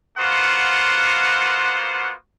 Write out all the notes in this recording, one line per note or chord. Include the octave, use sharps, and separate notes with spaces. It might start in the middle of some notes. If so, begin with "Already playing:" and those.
A#3 B3 F4 F#4 C5 F#5